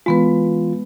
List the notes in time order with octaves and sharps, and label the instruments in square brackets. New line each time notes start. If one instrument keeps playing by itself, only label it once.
[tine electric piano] E3 F4 [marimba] G#3 B3 B4